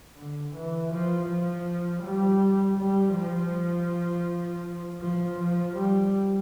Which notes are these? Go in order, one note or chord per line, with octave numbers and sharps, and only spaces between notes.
D3
E3
F3
F3
G3
G3
F3
F3
F3
G3